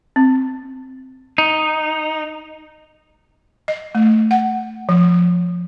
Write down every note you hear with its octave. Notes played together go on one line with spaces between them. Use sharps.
C4
D#4
D#5
A3
F#5
F3